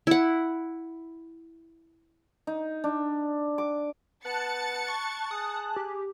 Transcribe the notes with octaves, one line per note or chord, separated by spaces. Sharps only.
E4 F#5
D#4
D4
D6
B3 A5 F#6 A6 C#7
C#6
G#4 D#6
G4